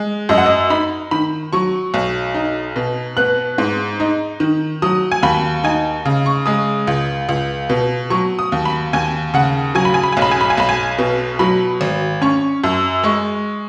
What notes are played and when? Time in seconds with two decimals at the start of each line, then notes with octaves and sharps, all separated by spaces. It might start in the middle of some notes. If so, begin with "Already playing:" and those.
Already playing: G#3
0.29 F#2 D#5
0.38 F#5
0.46 D#5
0.70 D#4 B5
1.11 D#3 B5
1.53 F#3 C#6
1.94 B1
2.34 D#4
2.76 B2
3.17 B3 F#6
3.58 G#2
4.00 D#4
4.40 D#3
4.82 F#3 D#6
5.12 G#5
5.23 D#2 B5
5.64 D#4 G#5
6.05 C#3
6.26 C#6
6.46 G#3 D#6
6.87 C#2
7.29 C#2
7.70 B2
8.10 F#3 C#6
8.39 D#6
8.52 D#2
8.65 B5
8.93 D#2 G#5
9.34 C#3 F#5
9.75 F#3 G#5
9.85 B5
9.94 G#5
10.03 B5
10.12 G#5
10.17 B1
10.22 B5
10.31 G#5
10.41 B5
10.50 G#5
10.57 B1 B5
10.69 G#5
10.98 B2
11.39 F#3 B5
11.81 G#1
12.22 C#4 C#6
12.64 F#2
13.04 G#3 C#6